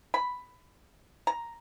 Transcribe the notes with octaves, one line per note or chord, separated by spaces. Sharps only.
B5
A#5